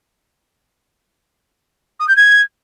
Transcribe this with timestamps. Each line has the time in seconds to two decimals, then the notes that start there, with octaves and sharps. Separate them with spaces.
1.99 D#6
2.08 G6
2.16 G#6